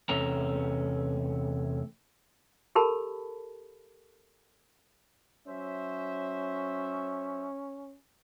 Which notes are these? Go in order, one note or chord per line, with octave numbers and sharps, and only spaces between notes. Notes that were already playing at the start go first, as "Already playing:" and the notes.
E2 C3 A3 C#4 A#5
G4 A4 A#4 A5 B5
F#3 C#4 C5 E5